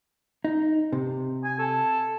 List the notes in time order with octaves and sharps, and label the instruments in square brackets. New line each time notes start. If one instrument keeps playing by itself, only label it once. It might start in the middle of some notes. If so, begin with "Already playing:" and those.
[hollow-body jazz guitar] D#4
C3
[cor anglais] G#5
A4